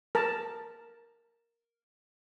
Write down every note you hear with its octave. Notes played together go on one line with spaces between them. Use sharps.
A#4 A5